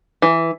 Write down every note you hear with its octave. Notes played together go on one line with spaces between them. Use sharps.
E3